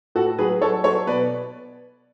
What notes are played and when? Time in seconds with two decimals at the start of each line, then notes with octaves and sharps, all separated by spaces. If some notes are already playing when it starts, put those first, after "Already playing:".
0.15 A2 F#4 A4
0.38 F#3 G#4 B4
0.61 F#3 A4 C#5
0.84 F#3 A4 C#5
1.07 B2 B4 D5